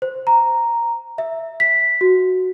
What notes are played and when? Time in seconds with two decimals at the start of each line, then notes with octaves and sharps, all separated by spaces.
0.02 C5
0.27 A#5
1.18 E5
1.60 B6
2.01 F#4